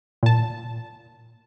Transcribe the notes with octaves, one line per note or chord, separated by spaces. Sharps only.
A#2 A5